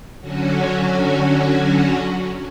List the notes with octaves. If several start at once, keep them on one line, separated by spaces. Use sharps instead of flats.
D3 F#3 C#4 F#4